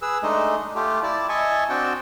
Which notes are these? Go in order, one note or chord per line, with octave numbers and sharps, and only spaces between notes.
G#4 B4 E6
G#3 A3 D4 D#4 D#5
A3 F4 G4
E4 D5 A5
D#5 E5 G#5 A5 C#6
C4 D4 F#4 G5 A5